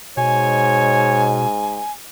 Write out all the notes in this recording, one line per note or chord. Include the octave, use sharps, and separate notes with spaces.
G#2 B2 C#5 G#5